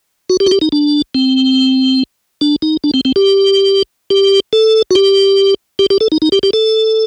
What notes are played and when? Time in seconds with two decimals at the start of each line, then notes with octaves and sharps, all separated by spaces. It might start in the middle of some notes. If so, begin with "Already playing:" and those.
0.30 F#4
0.40 G4
0.46 F#4
0.51 G4
0.61 D#4
0.72 D4
1.15 C4
2.41 D4
2.62 D#4
2.84 D4
2.94 C4
3.05 C4
3.16 G4
4.10 G4
4.53 A4
4.91 F#4
4.95 G4
5.79 G4
5.90 G4
6.01 A4
6.12 D#4
6.22 D#4
6.32 G4
6.43 G4
6.53 A4